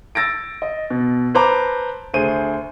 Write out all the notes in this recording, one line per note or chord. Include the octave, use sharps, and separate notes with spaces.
E6 A6 A#6 D7
D#5
B2
B4 C5 A5 A#5 D6
D2 G#4 C5 D#7